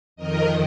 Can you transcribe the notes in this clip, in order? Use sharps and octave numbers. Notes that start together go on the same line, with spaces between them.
F2 D#3 A#4 D#5